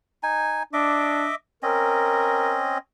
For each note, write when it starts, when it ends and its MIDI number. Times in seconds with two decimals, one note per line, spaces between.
0.23 0.63 63
0.23 0.63 80
0.73 1.29 62
0.73 1.35 75
0.73 1.35 76
0.73 1.35 86
1.63 2.78 60
1.63 2.78 61
1.63 2.58 70
1.63 2.78 75